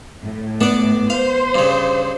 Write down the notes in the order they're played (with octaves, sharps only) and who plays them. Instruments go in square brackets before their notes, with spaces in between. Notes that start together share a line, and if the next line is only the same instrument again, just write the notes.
[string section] A2
[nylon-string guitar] B3 [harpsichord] D4 D5
[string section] C5 [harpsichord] F5
[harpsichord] G2 C#3